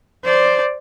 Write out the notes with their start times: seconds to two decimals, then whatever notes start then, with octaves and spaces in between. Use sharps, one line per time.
0.24 C5 D5